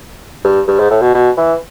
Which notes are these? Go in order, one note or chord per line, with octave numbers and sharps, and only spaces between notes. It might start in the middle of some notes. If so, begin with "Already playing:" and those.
G2
G2
G#2
A2
B2
B2
E3